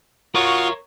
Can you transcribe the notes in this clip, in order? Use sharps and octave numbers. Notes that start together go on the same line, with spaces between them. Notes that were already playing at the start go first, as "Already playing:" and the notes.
F4 F#4 A#4 C#5 C#6 D#6